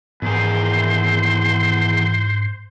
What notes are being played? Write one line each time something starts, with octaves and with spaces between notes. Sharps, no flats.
E2 G#2 D#3 G#4 C5